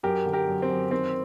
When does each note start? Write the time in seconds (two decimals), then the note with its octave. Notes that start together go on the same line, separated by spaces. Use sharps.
0.03 F#2 G4 A#4
0.25 D3
0.33 G4 A#4
0.47 F#2
0.62 C4
0.70 F#2
0.91 D#3 C4